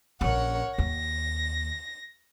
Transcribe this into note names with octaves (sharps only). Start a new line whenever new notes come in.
A#1 C#4 A#4 C#5 F#5
D#2 A#6